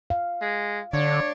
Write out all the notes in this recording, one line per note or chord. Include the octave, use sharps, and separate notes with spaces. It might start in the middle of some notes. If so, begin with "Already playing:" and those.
F5
G#3
D3 D4 C#5 D5